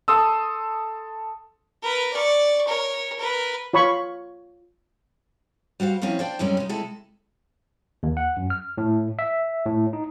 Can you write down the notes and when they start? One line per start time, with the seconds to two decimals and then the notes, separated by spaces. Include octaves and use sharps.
0.08 A4 C6 D#6 E6
1.83 A#4 B4
2.13 D5 C#6
2.67 A#4 C#5
3.19 A#4 B4
3.73 F4 C#5 B5 C#6
5.80 G3 F#4 C5 F5
6.02 F3 A#3 C4 C#4 E4
6.19 D4 C5 D5 G5
6.39 F#2 C3 G3 G#3 C#4
6.57 G#3 D#4
6.69 C3 G#3 E4 A4
8.03 D#2
8.17 F#5
8.37 F#2
8.50 F6
8.78 A2
9.19 E5
9.65 A2
9.93 D#4